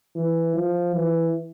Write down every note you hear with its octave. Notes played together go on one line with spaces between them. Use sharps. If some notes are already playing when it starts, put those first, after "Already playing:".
E3
F3
E3